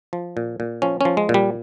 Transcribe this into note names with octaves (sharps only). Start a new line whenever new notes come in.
F3
A#2
A#2
F3 C#4
F3 C#4
G#3
A#2
G3